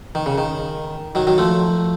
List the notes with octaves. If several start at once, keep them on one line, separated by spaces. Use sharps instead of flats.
D#3
C#3
D#3
D#3 F#3
D#3 F#3
F3 A3